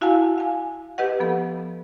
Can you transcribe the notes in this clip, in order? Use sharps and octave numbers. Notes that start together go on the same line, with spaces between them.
E4 F#4 F5 F#5 G#5 A5
F5 G#5
G4 B4 D#5 F#5
F3 B3 A4